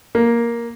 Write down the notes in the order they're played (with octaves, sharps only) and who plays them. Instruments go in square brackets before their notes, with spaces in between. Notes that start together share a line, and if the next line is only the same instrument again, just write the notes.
[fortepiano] A#3